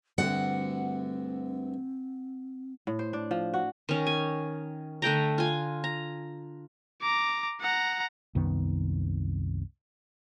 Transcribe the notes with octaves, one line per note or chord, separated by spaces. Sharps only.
D2 G2 C4 F#5
A2
C5
D4
F3
F#4
D#3 C#4
G#5
D3 A3 G5 A#5
F4 G#5
A#5
A#5 D6
F#5 A#5
C2 F#2 D#3 B3